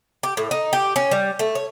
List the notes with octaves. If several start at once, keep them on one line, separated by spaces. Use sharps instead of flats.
G4
A2
D#4
G4
C#4
G3
A3
C#5